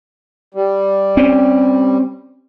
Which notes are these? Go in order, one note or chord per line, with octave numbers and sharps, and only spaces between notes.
G3
C4 C#4